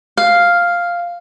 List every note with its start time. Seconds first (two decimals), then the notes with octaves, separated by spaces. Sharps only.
0.17 F5